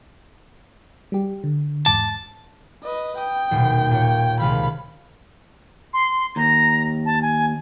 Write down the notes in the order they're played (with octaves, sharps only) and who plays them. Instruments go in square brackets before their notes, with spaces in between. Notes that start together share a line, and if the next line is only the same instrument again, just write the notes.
[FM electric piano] G3 G4
D3
[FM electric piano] E2 G#2 D6 [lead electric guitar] A5
[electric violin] B4 D#5
[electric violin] G5 [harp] D#6
[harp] D#1 B2
A#2 C#5
[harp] C#2 C3 D#3 [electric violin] F5 B5
[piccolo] C6
[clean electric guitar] D#2 [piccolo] A#5
[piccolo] A5
G#5